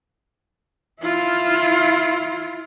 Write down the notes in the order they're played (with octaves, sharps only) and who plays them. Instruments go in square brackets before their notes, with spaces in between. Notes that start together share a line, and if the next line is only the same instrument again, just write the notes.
[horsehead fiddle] E4 F4